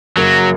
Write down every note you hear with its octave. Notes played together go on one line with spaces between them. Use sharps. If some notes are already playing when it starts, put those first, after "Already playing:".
F#2 C#3 F#3 A#3